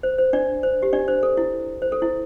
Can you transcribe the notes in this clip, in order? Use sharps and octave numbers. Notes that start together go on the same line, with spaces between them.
C5
C5
D4 D5
C5
G4
D4 D5
C5
A4
E4
C5
A4
E4